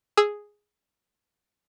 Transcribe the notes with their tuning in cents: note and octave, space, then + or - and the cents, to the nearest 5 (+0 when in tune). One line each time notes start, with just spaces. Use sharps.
G#4 +0 E6 +0